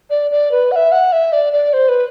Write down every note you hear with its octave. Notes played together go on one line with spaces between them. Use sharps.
D5
D5
B4
F#5
E5
F#5
E5
D5
D5
C5
B4